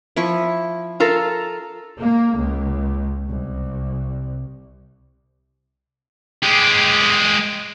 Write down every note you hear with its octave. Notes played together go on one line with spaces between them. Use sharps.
F3 E4 C#6
F4 A4 A#4
A#3
C#2
C2
G#3 G4